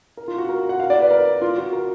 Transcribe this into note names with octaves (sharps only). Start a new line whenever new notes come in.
A#4
F4
F#4
A#4
F#5
F5
D5
B4
A#4
F4
F#4
A#4